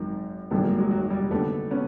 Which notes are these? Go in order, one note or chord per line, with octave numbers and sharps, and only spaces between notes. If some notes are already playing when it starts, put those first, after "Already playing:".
Already playing: G#1 F#2 D#3
G#1 G2 D3 A3 B3
G#3 A#3
F#3 G#3
F#3
G3
D#2 D3 A3 B3
B3 C#4